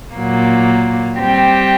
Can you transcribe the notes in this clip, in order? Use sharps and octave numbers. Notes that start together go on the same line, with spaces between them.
A#2 F#3 A#3
G3 C4 G4